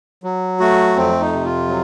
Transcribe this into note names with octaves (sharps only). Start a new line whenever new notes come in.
F#3
A3 F#4
F2 C4
D#4
C3
F4
F#3